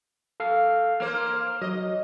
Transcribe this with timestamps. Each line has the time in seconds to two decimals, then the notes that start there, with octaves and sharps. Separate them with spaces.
0.40 A4 F5
1.00 A#3 C5 F6
1.61 F#3 D#5